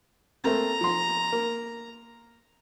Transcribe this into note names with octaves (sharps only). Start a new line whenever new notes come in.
A3 A#3 C4 A#5
F3 C6
A#3